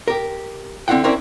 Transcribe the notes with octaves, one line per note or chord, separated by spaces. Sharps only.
G4 A#4
D3 C4 E4 F4 F#5 G5
C4 C#4 E4 A#4 C5 D5